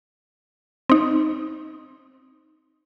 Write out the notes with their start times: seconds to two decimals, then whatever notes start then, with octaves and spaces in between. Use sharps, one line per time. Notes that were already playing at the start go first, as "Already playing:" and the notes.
0.89 C4 D#4